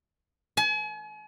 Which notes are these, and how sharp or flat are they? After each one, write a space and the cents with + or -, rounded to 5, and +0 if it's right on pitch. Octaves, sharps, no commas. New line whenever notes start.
G#5 +40